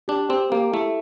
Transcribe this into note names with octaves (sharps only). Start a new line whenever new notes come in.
D4 G4
C4 G4
A#3 G4
A3 E4